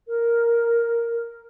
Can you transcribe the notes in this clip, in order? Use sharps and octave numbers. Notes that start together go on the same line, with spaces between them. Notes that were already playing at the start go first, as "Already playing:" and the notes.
A#4